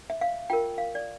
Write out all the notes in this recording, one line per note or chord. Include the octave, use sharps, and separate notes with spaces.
E5
F5
F4 A#4 G5
F5
D5